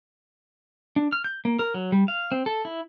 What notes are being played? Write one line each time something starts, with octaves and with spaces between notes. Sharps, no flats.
D4
F6
G6
A#3
A#4
F#3
G3
F5
C4
A4
E4